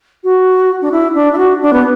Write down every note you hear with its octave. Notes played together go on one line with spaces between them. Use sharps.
F#4
D4
E4
D4
E4
F#4
D4
B3